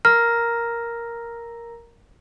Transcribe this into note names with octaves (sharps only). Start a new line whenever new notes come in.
A#4 A#5 F6 A#6